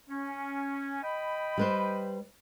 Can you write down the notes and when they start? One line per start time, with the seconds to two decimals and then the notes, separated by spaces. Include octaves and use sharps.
0.09 C#4
1.03 D#5 G5 B5
1.58 G3 B4 C5